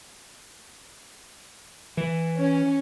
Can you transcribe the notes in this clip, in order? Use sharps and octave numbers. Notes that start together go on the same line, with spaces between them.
E3
C#4